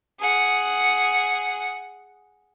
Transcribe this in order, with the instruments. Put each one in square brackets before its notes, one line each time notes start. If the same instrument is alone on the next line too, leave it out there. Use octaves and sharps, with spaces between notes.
[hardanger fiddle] G#4 F#5